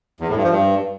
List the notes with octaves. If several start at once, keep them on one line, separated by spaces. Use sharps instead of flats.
E2
A2
G2
F3
G2